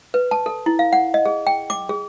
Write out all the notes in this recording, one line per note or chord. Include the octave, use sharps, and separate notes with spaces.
B4
A5
A4
E4
F5
F#5
D#5
G#4
G5
D6
G#4